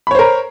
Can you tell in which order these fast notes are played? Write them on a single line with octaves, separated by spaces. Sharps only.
B5 C#5 C5 A#4